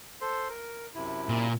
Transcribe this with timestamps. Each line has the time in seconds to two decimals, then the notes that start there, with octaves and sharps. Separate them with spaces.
0.21 A4 C5 C6
0.49 A#4
0.95 F#2 C3 E4
1.29 A#2